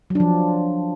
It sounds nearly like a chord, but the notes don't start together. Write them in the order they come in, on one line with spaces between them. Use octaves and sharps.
F#3 D4 F3